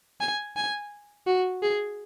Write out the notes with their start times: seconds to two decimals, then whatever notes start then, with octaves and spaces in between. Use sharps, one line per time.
0.20 G#5
0.56 G#5
1.26 F#4
1.62 G#4